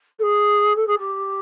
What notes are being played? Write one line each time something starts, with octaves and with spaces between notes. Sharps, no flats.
A4
G#4
A4
G#4
G4